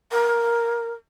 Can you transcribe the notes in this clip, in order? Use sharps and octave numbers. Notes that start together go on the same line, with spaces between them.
A#4